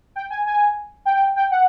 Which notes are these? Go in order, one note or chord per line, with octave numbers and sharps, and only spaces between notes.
G5
G#5
G#5
G5
G5
G5
F#5